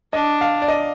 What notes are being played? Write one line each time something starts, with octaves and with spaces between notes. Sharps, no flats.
D4 D#5
F5
D5
D#5